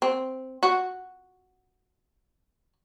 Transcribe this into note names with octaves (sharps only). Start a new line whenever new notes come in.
C4
F#4